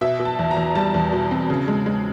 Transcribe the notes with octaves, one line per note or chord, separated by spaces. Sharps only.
B2 E5
B2
A5
E2
A#5
E2
G3 A5
E2
B2
C4
C#3
G#3
G#3